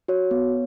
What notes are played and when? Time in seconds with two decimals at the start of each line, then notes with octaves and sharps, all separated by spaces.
0.08 F#4 C#5
0.31 B3